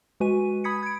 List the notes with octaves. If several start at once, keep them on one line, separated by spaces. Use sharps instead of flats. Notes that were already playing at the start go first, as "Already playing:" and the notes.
G#3 F#4 B4 G#5 D#7
B5 D#6 G#6 B6 C#7
G#6 D7